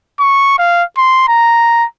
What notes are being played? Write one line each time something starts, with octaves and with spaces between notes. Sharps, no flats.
C#6
F5
C6
A#5